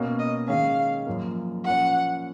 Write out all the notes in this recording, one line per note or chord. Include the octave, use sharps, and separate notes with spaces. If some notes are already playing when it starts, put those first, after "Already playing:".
Already playing: B2 A#3 C#4
D#5
D#3 G#3 C#4 F5
F#2 F3 A#3
A#2 F3 A#3 C#4 F#5